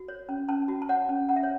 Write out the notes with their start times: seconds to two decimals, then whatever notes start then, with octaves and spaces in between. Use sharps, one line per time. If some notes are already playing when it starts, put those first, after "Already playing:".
Already playing: F#4
0.08 C#5
0.29 C#4
0.49 C#4 A5
0.68 F#4
0.82 A5
0.89 C#5 F#5
1.09 C#4
1.29 C#4 F#5
1.36 E5
1.43 C#5